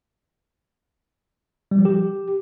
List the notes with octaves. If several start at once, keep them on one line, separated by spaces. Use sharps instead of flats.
G3
F3
G4